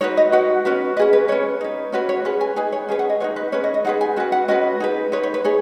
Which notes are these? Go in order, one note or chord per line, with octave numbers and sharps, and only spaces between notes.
D#4 F#4 B4 C#5
D#5
D#4 F#4 B4 F#5
C#4 F#4 B4
C#4 G#4 B4 D#5
B4
C#4 B4 C#5
D#4 B4
C#4 F#4 B4 C#5
C#5
C#4 G#4 B4
G#5
D#4 G#4 B4 G#5
C#5
C#4 G#4 B4
F#5
D#5
D#4 F#4 B4 C#5
B4
C#4 G#4 B4 C#5
D#5
D#5
D#4 G#4 B4 F#5
G#5
C#4 F#4 B4
F#5
C#4 F#4 B4 D#5
D#4 G#4 B4
D#4 B4 C#5
C#5
B4
D#4 G#4 C#5